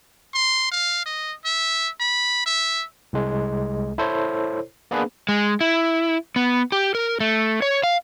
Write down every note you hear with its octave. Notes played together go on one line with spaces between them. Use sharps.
C6
F5
D#5
E5
B5
E5
C2 G#3
E4 A4 C5 C#5
A#3 B3 D4 G#4 B4
G#3
E4
B3
G4
A#4
A3
C#5
F5